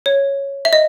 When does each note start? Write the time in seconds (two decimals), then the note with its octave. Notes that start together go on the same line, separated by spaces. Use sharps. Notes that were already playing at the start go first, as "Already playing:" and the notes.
0.06 C#5
0.65 E5
0.73 D#5